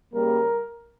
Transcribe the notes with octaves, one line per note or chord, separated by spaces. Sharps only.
C#3 G3 A#3 A#4